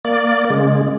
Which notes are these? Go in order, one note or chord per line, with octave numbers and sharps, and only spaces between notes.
A#3 D5
C#3 G#3